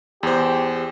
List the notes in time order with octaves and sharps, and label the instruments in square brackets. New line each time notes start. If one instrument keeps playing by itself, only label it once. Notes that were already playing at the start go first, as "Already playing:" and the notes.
[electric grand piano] E2 C5 [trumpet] G4